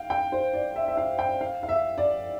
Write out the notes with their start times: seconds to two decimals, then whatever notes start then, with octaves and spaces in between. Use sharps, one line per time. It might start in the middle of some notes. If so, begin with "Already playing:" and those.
Already playing: F5 G5
0.10 G5
0.32 C5
0.53 D5
0.76 E5
0.88 E5
0.97 F5
1.19 G5
1.41 F5
1.63 F5
1.69 E5
1.98 D5